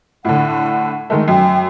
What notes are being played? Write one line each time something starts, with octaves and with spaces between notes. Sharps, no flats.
A2 D3 F#5
D#3 G#3 A3
F#2 G5